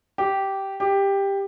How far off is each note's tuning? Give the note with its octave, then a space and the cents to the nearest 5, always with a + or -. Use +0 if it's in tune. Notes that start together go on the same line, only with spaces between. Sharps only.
G4 -10
G4 +10